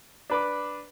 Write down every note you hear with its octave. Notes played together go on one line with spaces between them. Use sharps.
D4 B4 D6